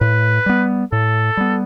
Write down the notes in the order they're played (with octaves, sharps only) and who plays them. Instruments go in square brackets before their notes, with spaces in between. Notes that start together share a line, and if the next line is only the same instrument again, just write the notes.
[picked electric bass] A2 [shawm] B4
[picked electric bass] G3 B3
[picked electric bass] A2 [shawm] A4
[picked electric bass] G3 B3